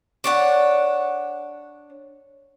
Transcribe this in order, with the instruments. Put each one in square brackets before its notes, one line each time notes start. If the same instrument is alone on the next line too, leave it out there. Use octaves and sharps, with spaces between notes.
[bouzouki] D4 C#5 F#5